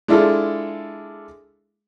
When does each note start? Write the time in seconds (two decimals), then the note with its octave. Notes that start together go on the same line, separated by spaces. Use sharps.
0.08 G#3 D4 E4 F4 A4